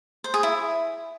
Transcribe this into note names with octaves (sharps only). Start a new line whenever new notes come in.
C5
G#4
E4